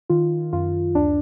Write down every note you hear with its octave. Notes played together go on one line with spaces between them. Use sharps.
D#3 F4
F#2 F4
D2 D4